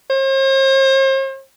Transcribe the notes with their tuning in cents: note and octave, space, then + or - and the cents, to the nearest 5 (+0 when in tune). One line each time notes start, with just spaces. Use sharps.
C5 +45